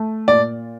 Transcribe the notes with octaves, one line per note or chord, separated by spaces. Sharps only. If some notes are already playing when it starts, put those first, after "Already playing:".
Already playing: A3
A#2 D5